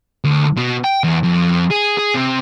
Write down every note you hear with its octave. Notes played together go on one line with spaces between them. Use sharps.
D2
B2
G5
E2
F2
G#4
G#4
C3